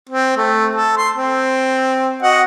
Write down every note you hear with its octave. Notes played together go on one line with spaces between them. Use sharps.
C4
A3
A4
C6
C4
F#4 D#5 F#5